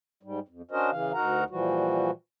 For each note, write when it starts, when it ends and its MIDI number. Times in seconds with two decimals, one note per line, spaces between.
0.23 0.39 44
0.23 0.39 55
0.48 0.62 41
0.71 0.90 61
0.71 0.90 62
0.71 0.90 66
0.71 0.90 70
0.71 0.90 72
0.71 0.90 75
0.91 1.12 49
0.91 1.12 52
0.91 1.12 77
1.13 1.44 38
1.13 1.44 63
1.13 1.44 66
1.13 1.44 70
1.13 1.44 78
1.13 1.44 82
1.50 2.11 46
1.50 2.11 52
1.50 2.11 53
1.50 2.11 55
1.50 2.11 66